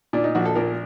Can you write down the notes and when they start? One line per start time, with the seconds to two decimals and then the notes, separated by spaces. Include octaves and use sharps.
0.13 A#2 D4
0.24 D#4
0.35 A#1 F#4
0.45 A4
0.56 A#2 A#4